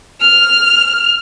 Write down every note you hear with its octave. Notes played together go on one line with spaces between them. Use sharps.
F6